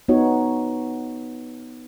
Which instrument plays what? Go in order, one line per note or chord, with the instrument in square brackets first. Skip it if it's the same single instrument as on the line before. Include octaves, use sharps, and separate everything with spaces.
[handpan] B3 D#4 F#4 C#5